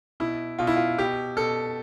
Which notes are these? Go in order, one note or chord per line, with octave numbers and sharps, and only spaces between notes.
B2 E4
B2 F4
E4
F4
B2 G4
B2 A4